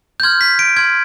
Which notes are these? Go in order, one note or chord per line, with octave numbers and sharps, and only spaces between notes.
G6
C6 F6 G#6
B6
D7
C6 F6 G#6